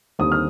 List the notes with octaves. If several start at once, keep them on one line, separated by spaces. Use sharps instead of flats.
D#2 D3 G3 C4 D#6
F6